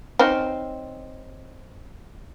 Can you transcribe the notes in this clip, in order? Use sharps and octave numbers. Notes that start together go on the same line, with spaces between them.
C4 C#4 D#4